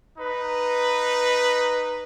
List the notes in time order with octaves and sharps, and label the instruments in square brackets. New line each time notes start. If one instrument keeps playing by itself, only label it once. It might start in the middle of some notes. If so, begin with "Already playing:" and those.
[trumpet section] D#4 B4